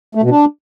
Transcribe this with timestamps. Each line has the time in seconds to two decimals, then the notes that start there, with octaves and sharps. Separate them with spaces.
0.15 A3
0.23 B2
0.30 D4